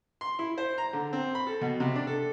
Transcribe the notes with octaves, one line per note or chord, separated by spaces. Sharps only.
C6
E4
C5
A#5
D3
C4
B5
A4
B2
C3
D4
A4